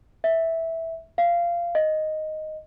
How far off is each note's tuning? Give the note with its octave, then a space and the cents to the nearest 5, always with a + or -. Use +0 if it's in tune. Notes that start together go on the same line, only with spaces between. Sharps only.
E5 -10
F5 -20
D#5 +0